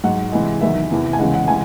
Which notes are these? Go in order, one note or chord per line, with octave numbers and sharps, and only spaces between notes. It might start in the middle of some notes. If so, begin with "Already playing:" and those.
G#2 F#3 F#5
C3 E3 G#3
E2 D#3 F#3 E5
E2 C3 E3
G#5
E2 C#3 G#3 F#5
F#5
C3 E3 G#3 G#5